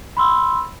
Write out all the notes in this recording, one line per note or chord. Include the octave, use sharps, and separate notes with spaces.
B5 C6 E6